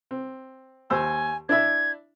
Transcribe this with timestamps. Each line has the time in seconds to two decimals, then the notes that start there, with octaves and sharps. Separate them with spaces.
0.11 C4
0.90 D#2 C5 G#5 E6
1.49 D4 E4 E5 G#6